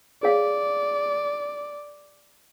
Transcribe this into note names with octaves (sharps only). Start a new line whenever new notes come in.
G#4 C#5 D5 F5